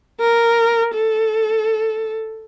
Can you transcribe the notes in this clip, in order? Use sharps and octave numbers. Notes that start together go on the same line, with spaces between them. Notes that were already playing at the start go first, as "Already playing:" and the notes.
A#4
A4